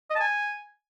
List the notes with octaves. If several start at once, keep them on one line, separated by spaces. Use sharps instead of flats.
D#5
A5
G#5